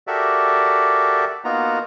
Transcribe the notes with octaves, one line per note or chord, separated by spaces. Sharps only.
F#4 G4 A4 A#4 D5 E5
A#3 B3 D#4 F4 F#4 A#5